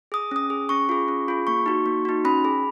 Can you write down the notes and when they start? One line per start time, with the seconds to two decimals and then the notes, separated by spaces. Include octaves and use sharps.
0.12 G#4 D#6
0.31 C#4 D#6
0.50 G#4
0.69 C#4 C#6
0.89 F4 G#4
1.08 C#4
1.28 F4 G#4
1.47 A#3 C#6
1.66 D#4 F#4
1.86 A#3
2.05 D#4 F#4
2.25 C#4 B5
2.45 G#4